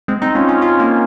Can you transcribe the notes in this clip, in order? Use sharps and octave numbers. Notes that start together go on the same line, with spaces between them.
G#3 C4
C4 D#4
C#4 F4
C#4 F4
C#4 F4
A#3 C#4